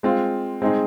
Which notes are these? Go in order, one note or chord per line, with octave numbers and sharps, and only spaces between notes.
G#3 C4 F4
G#3 C4 D#4 G#4